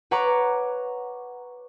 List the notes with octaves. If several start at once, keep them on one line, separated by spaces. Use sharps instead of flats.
B4 C#5 F#5 A#5 C#6 D6